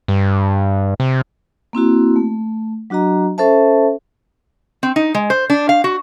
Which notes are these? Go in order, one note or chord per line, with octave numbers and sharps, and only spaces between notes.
G2
C3
A#3 C4 E4 F#4
A3
F#3 D4 F#4 D#5 A#5
C#4 A4 C5 E5 A5
C4
D#4
G#3
C5
D4
F5
F#4